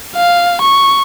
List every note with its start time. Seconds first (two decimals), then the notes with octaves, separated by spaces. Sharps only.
0.16 F5
0.61 C#6